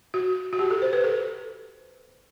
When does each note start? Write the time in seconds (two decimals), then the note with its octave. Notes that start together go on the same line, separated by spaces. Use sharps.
0.14 F#4
0.53 F#4
0.59 G4
0.71 A4
0.82 C5
0.93 B4
1.04 A4